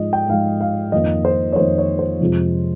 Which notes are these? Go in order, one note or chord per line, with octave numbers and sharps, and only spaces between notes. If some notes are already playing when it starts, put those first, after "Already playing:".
Already playing: G#2 F3 G#3 D#5
G5
G#2 F3 G#3 F5
F5
F2 D#3 A#3 D#5
C5
C#5
F2 D#3 A#3 C5
C#5
C5
F2 C3 F3 G#3